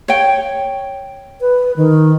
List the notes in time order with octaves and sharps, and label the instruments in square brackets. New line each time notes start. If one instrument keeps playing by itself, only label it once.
[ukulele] C#5 G5
[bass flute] B4
D#3